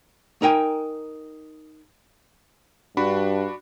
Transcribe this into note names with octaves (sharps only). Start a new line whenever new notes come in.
D#4 A#4 G5 G#5
G2 D4 F#4 B5